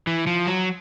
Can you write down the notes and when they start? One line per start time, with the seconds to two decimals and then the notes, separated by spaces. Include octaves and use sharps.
0.07 E3
0.27 F3
0.47 F#3